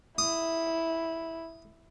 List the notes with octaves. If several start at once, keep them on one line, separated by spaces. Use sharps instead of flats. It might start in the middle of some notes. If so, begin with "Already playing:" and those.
E4 D#6